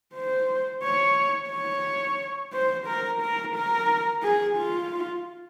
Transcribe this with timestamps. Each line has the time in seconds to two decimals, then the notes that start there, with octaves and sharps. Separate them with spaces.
0.14 C5
0.83 C#5
1.50 C#5
2.53 C5
2.87 A#4
3.21 A#4
3.55 A#4
4.23 G#4
4.56 F4